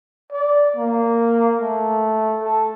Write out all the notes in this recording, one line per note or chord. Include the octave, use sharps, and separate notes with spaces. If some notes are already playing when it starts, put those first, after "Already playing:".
D5
A#3
A3
A4